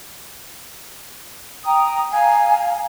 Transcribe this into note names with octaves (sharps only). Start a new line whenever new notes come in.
G5 A#5 D#6
F5 G#5 A#5